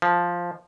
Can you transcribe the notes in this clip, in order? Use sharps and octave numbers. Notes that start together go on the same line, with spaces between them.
F3